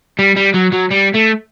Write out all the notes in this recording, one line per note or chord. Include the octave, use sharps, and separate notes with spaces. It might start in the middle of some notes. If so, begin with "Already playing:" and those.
G3
G3
F#3
F#3
G3
A3